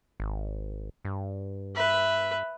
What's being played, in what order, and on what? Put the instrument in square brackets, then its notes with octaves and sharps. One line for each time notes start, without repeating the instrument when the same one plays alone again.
[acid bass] G#1
G2
[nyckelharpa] B4 E5